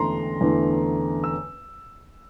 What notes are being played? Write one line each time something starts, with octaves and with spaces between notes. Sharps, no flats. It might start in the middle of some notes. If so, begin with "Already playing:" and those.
Already playing: E2 D3 A3 A#5 C6
E2 D3 A3
E6